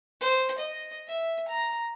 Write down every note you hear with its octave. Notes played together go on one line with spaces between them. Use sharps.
C5
D#5
E5
A#5